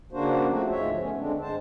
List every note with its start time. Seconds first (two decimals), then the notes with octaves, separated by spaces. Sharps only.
0.12 C#3 A#3 D4 F#4 C5
0.48 F3 A3 C4 F#4
0.70 D2 G#2 F3 G#3 C#5 E5
0.99 A3 B3 C#4
1.16 D3 G#3 C4 D4
1.41 G2 G#3 C5 A5